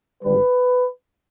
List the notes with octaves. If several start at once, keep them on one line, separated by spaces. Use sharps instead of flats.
G#1 G2 D3 G3 B4